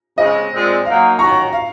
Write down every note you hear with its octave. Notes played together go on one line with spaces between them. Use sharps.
C#3 G#3 C4 D#5
A#2 G#3 C4
F#3 A#3 D#4 F5
D#3 F#3 C#4 F#4 A#5 C#6
F5